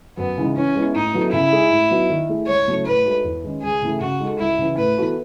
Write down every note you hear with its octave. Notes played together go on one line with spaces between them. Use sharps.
F#2 B3
C#3 E3 G#3 D#4
E3 C#4
G#3 B3 E4
A2 D#4
F#3 B3 E4 A4
C#3 E4
G#3 D#4 G#4
A2
F#3 B3 D#4 F#4
D#3
A3 E4 G#4
C#2 C#5
C#3 F#3 A3 E4
A2 B4
G#3 D#4 F#4 A4
E2
D#3 G#3 C#4
C#2 G#4
C#3 E3 A3 E4
C#3 F#4
G#3 D#4 A4
C#2 E4
C#3 E3
A2 B4
E3 B3 F#4 A4